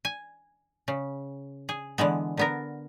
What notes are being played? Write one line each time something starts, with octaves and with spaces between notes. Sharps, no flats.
G#5
C#3
G#4
D3 E3 G#3 B3
D3 B3 A#4